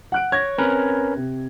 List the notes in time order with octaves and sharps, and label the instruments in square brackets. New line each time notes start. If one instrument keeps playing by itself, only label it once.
[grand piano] F#5 F#6 D7
[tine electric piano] C#5 [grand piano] G#6 A#6
[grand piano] C4 B5 [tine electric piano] C#4 A#4 B4
[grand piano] C3